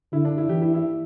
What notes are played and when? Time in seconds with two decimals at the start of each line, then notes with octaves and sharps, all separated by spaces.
0.13 D3 E4
0.25 D4
0.38 E4
0.49 E3 G4
0.62 E4
0.74 E4